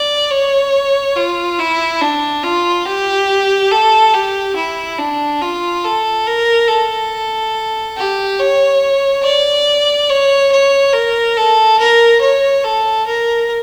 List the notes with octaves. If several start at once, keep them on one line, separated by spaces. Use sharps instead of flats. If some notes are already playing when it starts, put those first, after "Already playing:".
Already playing: D5
C#5
F4
E4
D4
F4
G4
A4
G4
E4
D4
F4
A4
A#4
A4
G4
C#5
D5
C#5
C#5
A#4
A4
A#4
C#5
A4
A#4